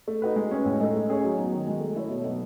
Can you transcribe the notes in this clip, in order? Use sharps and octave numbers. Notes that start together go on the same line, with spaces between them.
A3
D#4 F#4 B4
G#3
C#4 G#4 B4
A2
G#3 D#4 A4
A3
C#4 G#4 C#5
F#3
B3 D#4
D#3
G#3 D#4
A3
E4 A4 C#5
B2
F#3 B3 D#4